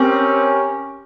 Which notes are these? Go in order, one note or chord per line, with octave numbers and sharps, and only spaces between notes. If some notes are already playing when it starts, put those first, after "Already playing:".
Already playing: C4 C#4 G4 A#4 C#5